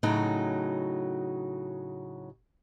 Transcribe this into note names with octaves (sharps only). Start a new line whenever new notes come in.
A2 C#3 F#3 D#4